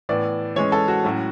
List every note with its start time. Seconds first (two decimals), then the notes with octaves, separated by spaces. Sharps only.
0.09 A2 E3 B3 D5
0.56 E3 G#3 C#4 C#5
0.72 A4
0.88 F#4
1.04 A2 F#3 C#4